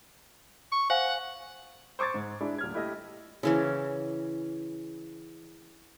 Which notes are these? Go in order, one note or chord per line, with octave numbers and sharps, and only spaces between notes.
C#6
C5 F5 F#5 G#5
C5 C#6 D6 G#6 A6
G#2
G#3 D4 E4
D#1 F6 G#6
A3 E4 G4 A4 D#5
C#3 E3 C#4